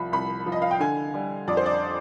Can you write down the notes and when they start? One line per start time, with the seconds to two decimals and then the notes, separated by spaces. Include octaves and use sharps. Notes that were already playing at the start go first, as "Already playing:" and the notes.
Already playing: C2 F3 B5
0.12 C2 B5
0.46 F3
0.52 D#5
0.62 F5
0.71 G5
0.80 D3 G#5
1.14 G3
1.48 F2 D5
1.57 C5
1.66 D5